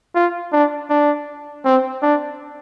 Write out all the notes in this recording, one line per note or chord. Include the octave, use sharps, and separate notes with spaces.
F4
D4
D4
C4
D4